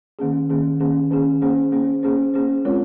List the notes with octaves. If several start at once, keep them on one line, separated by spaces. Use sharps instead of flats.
D#3 A#3 C#4 G#4
D#3 A#3 C#4 G#4
D#3 A#3 C#4 G#4
D#3 A#3 C#4 G#4
A#3 C#4 G#4 C5
A#3 C#4 G#4 C5
A#3 C#4 G#4 C5
A#3 C#4 G#4 C5
G#3 C4 F4 A#4 C#5